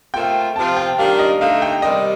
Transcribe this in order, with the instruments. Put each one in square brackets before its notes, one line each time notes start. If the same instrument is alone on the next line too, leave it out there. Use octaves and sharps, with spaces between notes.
[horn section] A#2 A3 C4 F4 [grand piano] G5
[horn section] C3 F3 C4 F4 [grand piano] A5
[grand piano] G5
[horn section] D#3 G3 D4 F4 [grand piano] F5
[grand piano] D#5
[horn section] D3 A3 D#4 [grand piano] F5
[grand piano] G5
[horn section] C3 D#3 G3 [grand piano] D#5